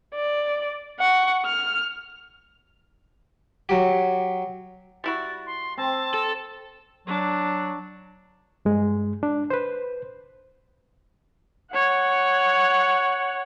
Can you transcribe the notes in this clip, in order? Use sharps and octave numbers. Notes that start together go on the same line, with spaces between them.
D5
F#5 C#6
F6
F#3 G4
G3 E4 F#4 A6
C6
C4 A5
A4
F#3 D4
G2 G#3
D4
B4 C5
C#5 F#5